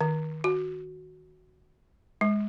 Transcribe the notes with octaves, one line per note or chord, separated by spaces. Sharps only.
D#3
F#4
G#3